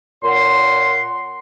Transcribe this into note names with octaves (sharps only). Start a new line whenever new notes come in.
A#2 A#4 C#5 F#5 C6